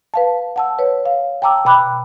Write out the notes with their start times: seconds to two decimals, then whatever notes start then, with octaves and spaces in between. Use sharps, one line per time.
0.14 B4 F5 A5
0.56 F#5 A5 E6
0.79 B4 C#5
1.06 F5
1.42 G5 A5 A#5 D6 E6
1.65 B2 G5 B5 D6 F#6